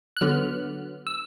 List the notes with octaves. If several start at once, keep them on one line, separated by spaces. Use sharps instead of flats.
F#6
D3 F#3 B3 F6
E6